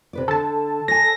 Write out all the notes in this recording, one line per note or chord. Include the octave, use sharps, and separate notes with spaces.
C3 B4 D5
D3 A4 A5
C#5 G#5 A#6